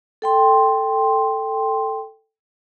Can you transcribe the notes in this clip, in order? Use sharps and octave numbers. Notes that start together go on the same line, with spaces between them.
A4 G5 C6